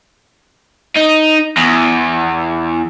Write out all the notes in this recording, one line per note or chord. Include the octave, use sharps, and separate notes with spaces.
D#4
E2